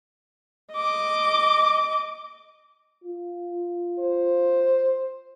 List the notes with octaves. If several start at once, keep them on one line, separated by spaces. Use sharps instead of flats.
D#5 D6
F4
C5